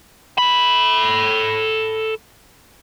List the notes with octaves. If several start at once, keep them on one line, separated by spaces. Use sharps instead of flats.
A4 B5